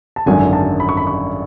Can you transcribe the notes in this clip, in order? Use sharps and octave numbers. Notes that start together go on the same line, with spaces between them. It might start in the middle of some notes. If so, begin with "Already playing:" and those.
A5
G#1 F#2 D3 G#5
A5
B5
C#6
B5
C#6